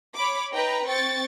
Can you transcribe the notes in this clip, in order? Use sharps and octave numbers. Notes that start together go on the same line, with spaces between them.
C#5 B5 D6
D#4 B4 G5 A#5
C4 G5 C#6 A6